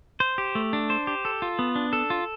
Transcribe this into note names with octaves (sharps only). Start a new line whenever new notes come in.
C5
G4
A3
D4
C5
G4
A4
F4
B3
D4
A4
F4